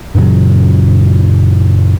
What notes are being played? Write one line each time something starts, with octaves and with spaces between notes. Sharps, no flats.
F#2 A#2 C#3 F#3